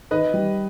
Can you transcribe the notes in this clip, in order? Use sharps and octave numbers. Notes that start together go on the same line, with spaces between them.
D#3 B4 D#5
G3